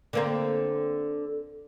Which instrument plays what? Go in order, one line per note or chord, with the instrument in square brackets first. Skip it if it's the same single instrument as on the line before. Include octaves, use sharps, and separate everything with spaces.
[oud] D3 A#3 C4